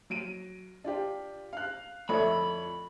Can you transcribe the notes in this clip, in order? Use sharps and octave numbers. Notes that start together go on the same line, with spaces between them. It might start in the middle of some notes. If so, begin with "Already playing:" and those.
F#3 D7 D#7
D4 F4 G4
F5 F#6
F2 A3 C#5 D5 B5